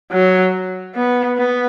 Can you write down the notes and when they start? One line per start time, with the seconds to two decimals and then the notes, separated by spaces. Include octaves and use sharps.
0.12 F#3
0.95 B3
1.37 B3